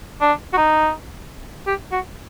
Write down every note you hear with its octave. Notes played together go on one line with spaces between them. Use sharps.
D4
F#4
D#4
G4
F#4